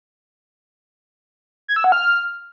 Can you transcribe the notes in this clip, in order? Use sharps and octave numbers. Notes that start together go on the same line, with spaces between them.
G#6
E6
F#5
F6